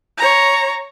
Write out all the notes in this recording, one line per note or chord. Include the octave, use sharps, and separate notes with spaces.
C#5 A#5